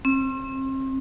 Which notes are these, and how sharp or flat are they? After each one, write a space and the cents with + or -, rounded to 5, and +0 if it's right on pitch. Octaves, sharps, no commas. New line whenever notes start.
C4 +35